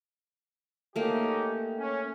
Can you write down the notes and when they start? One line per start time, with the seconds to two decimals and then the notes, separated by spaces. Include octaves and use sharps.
0.96 A3 A#3 C#4 D#4 G4
1.78 C#4